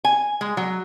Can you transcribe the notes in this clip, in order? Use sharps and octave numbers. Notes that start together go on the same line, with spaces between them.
G#5
G#3
F#3